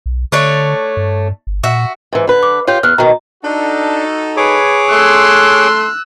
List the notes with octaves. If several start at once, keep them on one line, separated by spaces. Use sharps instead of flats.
B1
D3 A3 D4 C#5
G2
G1
A#2 F#4 E5
G#2 E3
D3 B4
D6
F4 G4 C#5 G6
E2 F6 F#6
B2 D#3 A#5
D4 D#4 F#4 A4
G#4 B4 C#5 D6
A3 C6 E6 F#6